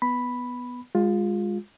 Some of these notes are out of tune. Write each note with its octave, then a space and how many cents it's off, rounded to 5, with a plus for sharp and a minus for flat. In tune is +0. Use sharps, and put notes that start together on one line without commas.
B3 +0 B5 +0
G#3 -20 F4 +20